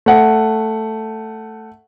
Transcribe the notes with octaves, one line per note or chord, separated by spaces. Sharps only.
A3 F#5